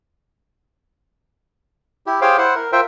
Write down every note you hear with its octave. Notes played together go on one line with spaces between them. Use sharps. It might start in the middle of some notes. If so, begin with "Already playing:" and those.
E4 G4
G4 G#4 C5 C#5 F5 G5
E4 C5 F#5
A#4
F4 A#4 C5 E5 G5